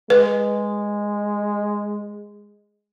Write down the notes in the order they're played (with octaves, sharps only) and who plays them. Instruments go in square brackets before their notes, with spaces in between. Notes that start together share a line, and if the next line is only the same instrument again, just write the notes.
[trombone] G#3 [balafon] B4